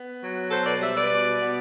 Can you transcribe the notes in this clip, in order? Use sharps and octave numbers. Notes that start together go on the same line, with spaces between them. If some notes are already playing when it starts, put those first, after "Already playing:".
Already playing: B3
F#3
B2 A4 C5
B4 D5
G3 C5 E5
B4 D5
B2
B3